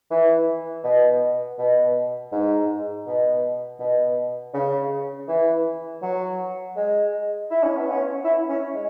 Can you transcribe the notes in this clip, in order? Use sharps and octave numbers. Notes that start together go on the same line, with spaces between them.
E3
B2
B2
G#2
B2
B2
C#3
E3
F#3
G#3
E4
C#4
B3
C#4
E4
C#4
G#3